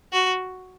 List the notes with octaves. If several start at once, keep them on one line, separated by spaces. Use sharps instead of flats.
F#4